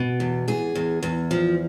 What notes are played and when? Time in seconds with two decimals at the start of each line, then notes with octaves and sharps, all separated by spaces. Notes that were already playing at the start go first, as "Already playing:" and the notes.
Already playing: B2
0.20 E2
0.48 E2 G#4
0.75 E2
1.03 E2
1.31 F3